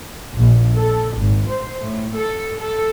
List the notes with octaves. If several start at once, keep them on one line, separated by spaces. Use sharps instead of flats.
A#1
A4
G#1
C5
A2
A4
A4